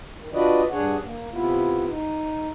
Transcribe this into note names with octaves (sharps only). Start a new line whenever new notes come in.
D#3
D4 F4 F#4 B4 D5 D#5
G2 D4 G#4 C#5 F#5
A#3
C3 B3 E4 F4
D#4